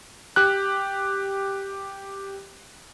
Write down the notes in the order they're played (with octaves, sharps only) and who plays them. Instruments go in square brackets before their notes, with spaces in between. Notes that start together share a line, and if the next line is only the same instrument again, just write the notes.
[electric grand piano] G4 F#6